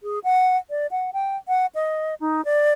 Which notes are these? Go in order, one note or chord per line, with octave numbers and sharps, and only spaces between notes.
G#4
F#5
D5
F#5
G5
F#5
D#5
D#4
D5